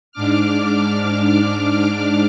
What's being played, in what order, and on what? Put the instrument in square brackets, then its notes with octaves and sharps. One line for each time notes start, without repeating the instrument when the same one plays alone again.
[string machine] G#2 D4 D6 F6